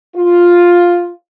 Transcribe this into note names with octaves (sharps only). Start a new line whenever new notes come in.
F4